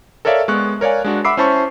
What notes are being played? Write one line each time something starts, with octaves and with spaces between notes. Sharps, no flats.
A4 A#4 C#5 D5 E5 F5
G#3 B3 C#6 F#6
A#4 C#5 D5 F5 G#5
G#3 D4 F#4
E5 F#5 B5 D6 E6 C7
C#4 E4 C5 A5 B5 C#6